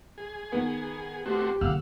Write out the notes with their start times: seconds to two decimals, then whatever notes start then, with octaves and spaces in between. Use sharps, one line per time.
0.18 G#4
0.52 D#3 B3
1.26 A3 C4 F#4 G4
1.61 F#1 D3 F5 F#5 E6